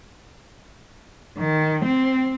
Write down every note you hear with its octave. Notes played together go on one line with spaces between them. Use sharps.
D#3
C4